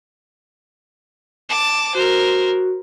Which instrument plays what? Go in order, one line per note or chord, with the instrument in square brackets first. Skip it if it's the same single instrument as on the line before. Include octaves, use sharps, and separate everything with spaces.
[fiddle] A5 D6
[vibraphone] F#4 [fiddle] A#4 C5